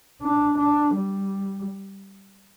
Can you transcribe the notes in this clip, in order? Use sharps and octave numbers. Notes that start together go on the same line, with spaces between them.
D4
D4
G3